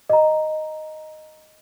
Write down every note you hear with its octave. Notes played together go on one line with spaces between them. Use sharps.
D#5 A#5